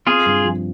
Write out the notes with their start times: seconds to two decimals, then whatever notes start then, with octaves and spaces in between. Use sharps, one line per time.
0.07 C4 F4 G#4
0.26 G2
0.45 F3